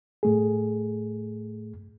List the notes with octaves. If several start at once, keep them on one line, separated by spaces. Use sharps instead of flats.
A2 A3 G#4